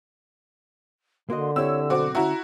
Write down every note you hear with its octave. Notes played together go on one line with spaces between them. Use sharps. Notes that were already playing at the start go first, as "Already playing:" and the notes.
D3 A#3 F#4 D#5 C6
C4 E4 G4 C#5 E6
B1 C4 F#4 A4 D6
D3 C#4 E4 F#4 E5 A#5